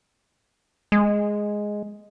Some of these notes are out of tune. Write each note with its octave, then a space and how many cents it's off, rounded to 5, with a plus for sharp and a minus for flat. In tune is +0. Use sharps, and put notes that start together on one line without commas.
G#3 +0